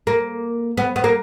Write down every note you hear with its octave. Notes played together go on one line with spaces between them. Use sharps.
A#3
B3
B3
A#3